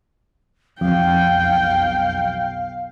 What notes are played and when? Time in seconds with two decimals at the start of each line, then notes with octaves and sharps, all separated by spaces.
0.81 B1 F2 F5 G5